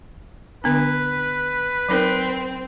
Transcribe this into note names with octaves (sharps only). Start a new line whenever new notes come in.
D3 B3 D4 B4
F#3 C4 D#4 A#4